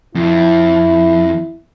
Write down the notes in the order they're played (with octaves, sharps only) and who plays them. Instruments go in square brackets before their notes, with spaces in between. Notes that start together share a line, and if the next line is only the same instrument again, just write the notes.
[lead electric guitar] F2 [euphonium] E4